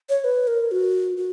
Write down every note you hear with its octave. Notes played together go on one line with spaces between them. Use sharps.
C#5
B4
A#4
F#4
F#4